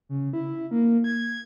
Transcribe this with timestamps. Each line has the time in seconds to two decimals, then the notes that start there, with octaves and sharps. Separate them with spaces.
0.09 C#3
0.33 E4
0.71 A#3
1.04 G#6